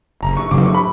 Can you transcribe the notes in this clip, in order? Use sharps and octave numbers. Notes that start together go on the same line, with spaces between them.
F#1 A#5
C#6
F#2 C#3 E3 D6
C#6
B5